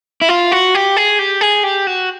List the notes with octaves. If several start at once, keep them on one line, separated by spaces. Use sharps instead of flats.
E4
F4
F#4
G4
G#4
G4
G#4
G4
F#4